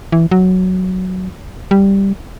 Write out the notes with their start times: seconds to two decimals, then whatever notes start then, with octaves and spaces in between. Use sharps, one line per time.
0.12 E3
0.31 F#3
1.71 G3